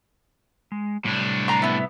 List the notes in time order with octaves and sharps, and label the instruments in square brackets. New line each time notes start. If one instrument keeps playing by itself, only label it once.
[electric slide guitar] G#3
[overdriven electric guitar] A2 D4 [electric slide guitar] C3 G3
[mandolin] A#5 C6
B3 E4